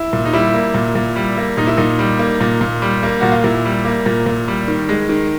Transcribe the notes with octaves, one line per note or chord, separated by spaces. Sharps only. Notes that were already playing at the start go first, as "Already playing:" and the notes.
Already playing: E4
A#2
D#4
G3 E4
A#3
A#2
A#2
G3
A#3
A#2 D#4
E4
A#2 D#4
G3
A#3
A#2
A#2
G3
A#3
A#2 F#4
F4
A#2 E4
G3
A#3
A#2
A#2
G3
D#3
G#3
D#3